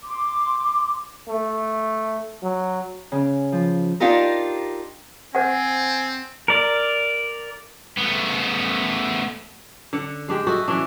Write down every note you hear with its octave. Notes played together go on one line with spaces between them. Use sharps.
C6 D6
A3
F#3
C#3
F3
D4 D#4 F4 G4 A#4
C4 C5 F#5 G#5
A#4 D5
A3 B3
D3 F#5
G#3 D4 G4
F#4 A4 D#5 E5
E3 F#3 C#4 D4